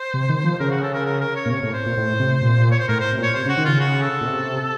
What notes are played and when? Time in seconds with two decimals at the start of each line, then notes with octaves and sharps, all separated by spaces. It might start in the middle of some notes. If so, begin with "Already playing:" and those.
Already playing: C5
0.14 C3
0.29 D#3
0.44 F3
0.60 C#3 A#4
0.71 F#4
0.83 A4
0.94 A#4
1.05 A#4
1.21 A#4
1.36 C#5
1.46 A#2
1.51 C3 C#5
1.63 A2
1.73 C5
1.86 A#2
1.97 A2
2.20 C3
2.42 A#2
2.71 C#5
2.80 C5
2.89 A2 A#4
3.00 C5
3.12 C3
3.18 A#2 C#5
3.34 C3 C5
3.46 C#3
3.49 F#4
3.57 D#3
3.65 C#3 F4
3.80 F#4
4.02 A4
4.21 A#2
4.26 C3